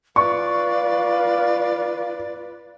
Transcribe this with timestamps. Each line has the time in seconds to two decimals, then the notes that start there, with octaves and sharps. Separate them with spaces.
0.16 F4 B4 D5 F5 C#6